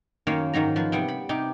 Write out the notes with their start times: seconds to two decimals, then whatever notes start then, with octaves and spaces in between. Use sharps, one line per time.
0.27 F#2 D#3 A#3 C#5 F5
0.53 G#2 D#3 F#3 A#5
0.76 F3 B4
0.92 C3 G3 B3 G5
1.08 B5
1.29 C3 D#4 G4